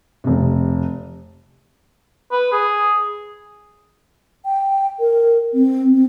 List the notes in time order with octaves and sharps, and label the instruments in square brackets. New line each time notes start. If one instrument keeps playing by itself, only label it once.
[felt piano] F1 C3
[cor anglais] B4
G#4
[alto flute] G5
A#4
C4
C4